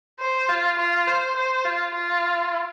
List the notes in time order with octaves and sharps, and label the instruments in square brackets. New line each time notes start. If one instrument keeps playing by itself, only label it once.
[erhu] C5
F4
F4
C5
C5
F4
F4